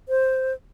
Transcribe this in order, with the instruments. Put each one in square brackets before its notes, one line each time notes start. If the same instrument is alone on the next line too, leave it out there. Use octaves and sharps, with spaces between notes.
[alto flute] C5